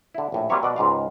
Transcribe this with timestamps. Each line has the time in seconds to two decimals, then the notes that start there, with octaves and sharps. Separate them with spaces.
0.14 D3 E4
0.32 A#1 A2
0.49 F#3 G3 A#3 C4 C#5 E5
0.63 B2 D5 F#5
0.76 C#2 G#2 F4 F5